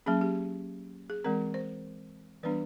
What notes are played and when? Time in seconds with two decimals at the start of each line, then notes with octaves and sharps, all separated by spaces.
0.06 F#3 A#3 C#4 G#4
0.21 G4
1.10 G#4
1.24 E3 G#3 C4 A#4
1.54 C5
2.43 E3 G3 B3 D4 B4